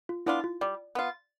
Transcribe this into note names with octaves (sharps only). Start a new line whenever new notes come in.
F4
B3 D4 E4 F4
F4
G3 D5
B3 F4